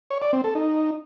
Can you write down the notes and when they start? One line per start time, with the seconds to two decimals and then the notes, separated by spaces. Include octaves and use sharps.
0.10 C#5
0.22 D5
0.33 C4
0.44 A4
0.55 D#4